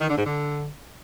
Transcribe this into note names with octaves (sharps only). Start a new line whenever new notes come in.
D#3
D3
G#2
D3